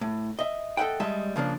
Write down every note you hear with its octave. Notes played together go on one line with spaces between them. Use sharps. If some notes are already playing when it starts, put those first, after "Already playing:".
A2
D#5 E5
A4 D#5 E5 F#5 G5
G3 G#3 D#5 E5 A5
C#3 F3 A#3 D4